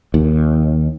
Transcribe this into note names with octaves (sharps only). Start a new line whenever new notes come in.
D#2